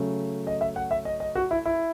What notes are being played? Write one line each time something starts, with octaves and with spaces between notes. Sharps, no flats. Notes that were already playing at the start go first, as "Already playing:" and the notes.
Already playing: C#3 F#3 A3
D#5
E5
F#5
E5
D#5
D#5
F#4
E4
E4